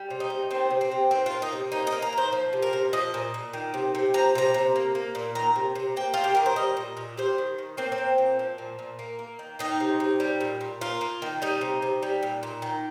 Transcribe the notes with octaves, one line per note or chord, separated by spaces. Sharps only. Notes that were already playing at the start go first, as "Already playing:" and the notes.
Already playing: G3
C3
D#4
C3
D#3 C4
C3
C4
C3
D#3 C4
F4
A#3
D#4
C3
A#3 D#4
D#5
A#3
A#5
D#3 C5
F3
C3
A#4
C3
F3 D#5
A#2
A#2
D#3
C3
C3
F3 A#5
C3 A#5
C3
A#3
A#3
A#2
D#3 A#5
C3
C3
A#3 G5
A#3 F4
G4
D#3 A#4
C5
G3 D#5
A#2
A#2
G3 C5
D#3
D#3
A#3 C4
C4
A#3
A#2
F3
A#2
A#2
A#3
A#3
D#3
D#3 D#4
C3
C3
G3
A#2
A#2
A#3 F4
A#3
D#3
G3 D#4
C3
C3
G3
A#2
A#2
D#3